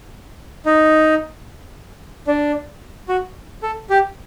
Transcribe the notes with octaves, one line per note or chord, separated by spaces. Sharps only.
D#4
D4
F#4
A4
G4